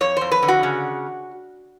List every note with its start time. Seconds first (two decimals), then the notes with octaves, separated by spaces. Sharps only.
0.01 F2 C#5
0.17 F2 C5
0.32 B4
0.42 D3
0.48 F#4
0.63 C#3